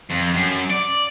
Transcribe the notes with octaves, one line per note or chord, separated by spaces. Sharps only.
F2
F#2
D5